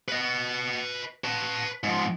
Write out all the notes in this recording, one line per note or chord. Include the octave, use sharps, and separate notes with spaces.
B4 D#5
B4 A5
G#2 F3